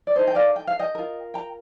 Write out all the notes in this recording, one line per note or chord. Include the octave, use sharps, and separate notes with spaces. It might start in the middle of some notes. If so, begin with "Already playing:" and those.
D5
D#4 A4 C5 D#5
G5
D5 F5
G5
F5
D#5 G5
F4 A#4
G5 A#5